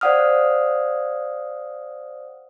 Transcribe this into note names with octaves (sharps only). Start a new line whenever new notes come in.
C5 D5 F5 F#5 D#6 F6